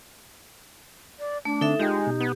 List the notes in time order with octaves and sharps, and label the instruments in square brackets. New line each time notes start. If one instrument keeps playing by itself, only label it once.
[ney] D5
[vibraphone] A3 [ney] D4
[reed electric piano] D3 C4 [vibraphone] D#4 A4 E5
[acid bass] G#3 [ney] D#4 [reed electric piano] F4 D#5 G5 [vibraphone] G4
[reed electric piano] B2
[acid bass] B3